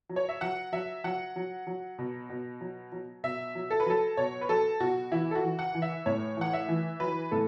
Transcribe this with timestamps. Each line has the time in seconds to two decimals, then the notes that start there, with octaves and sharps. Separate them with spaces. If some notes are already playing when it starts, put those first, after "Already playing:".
0.09 F#3
0.16 C#5
0.29 E5
0.41 F#3 F#5
0.72 F#3 E5
1.04 F#3 F#5
1.36 F#3
1.67 F#3
1.99 B2
2.29 B2
2.61 F#3
2.92 F#3
3.24 B2 E5
3.55 F#3
3.70 A4
3.80 B4
3.86 F#3 A4
4.17 B2 C#5
4.41 B4
4.49 F#3 A4
4.80 B2 F#4
5.12 E3 E4
5.31 A4
5.35 F#4
5.43 E3
5.59 F#5
5.75 E3
5.82 E5
6.06 A2 C#5
6.37 E3 F#5
6.53 E5
6.69 E3
7.00 F#3 B4
7.31 A2 A4